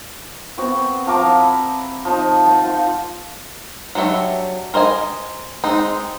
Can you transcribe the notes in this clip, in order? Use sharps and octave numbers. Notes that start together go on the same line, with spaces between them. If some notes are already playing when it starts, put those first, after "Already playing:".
B3 C4 F#4 C5
F3 F5 A#5 D6
E4
F3 D#4
C5 F#5 A5
F4
F#3 D4 G4 C#5 E5
A#4 C5 D#5 G#5
G#3 C4 D#4